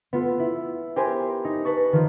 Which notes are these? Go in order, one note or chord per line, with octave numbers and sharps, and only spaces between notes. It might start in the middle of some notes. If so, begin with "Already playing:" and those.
B3 F4 A4
E4
G4 A#4 C5 G#5 B5 C6
D#4
B4 A5 C#6
D#3 F3 F4